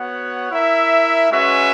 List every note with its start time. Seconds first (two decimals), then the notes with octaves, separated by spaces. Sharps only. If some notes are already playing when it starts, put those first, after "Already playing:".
Already playing: B3 F#4 C#5 F#5
0.51 E4 A#4 E5
1.31 G#3 C#4 F#4 B4 E5